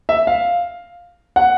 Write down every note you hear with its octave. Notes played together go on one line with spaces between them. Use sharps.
E5
F5
F#5